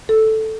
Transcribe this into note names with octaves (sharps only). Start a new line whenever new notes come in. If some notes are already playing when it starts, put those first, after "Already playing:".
A4